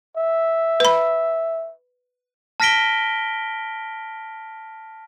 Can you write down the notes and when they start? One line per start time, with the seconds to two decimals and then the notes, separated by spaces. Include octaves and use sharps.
0.17 E5
0.80 B4 B5
2.60 A5 F6 A#6 B6 D7 G7